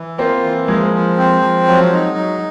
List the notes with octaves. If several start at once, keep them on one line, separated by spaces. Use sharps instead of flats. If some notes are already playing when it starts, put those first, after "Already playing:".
Already playing: E3
A#3 C4 F4
E3
F3 G#3 A#3
F3
C4
F3
F#3
D#4
F#3